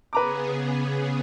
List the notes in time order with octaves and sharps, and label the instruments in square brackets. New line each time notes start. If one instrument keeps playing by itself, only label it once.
[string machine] C#3 B3 G#4 [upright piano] B4 A#5 D6